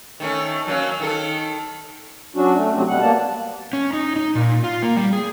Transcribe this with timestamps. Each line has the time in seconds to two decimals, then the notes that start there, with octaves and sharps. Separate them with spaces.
0.20 D#3 A3 C#4
0.67 F#3 A#3 C#4
1.00 D#3 D#4 A4
2.36 F#3 C#4 D4 F#4
2.55 A3
2.75 C3 F#3 A3 C4
2.88 B2 G3 F#5
3.01 A#3 B3 A5
3.73 C#4
3.93 D#4
4.16 D#4
4.35 A#2
4.64 F4
4.82 A#3
4.97 G3
5.13 G#4